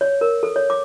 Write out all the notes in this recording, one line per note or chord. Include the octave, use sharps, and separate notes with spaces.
C#5
A#4
A4
C#5
D6